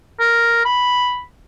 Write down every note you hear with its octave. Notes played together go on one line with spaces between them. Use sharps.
A#4
B5